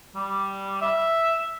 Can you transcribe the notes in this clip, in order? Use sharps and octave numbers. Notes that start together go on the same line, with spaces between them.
G3
E5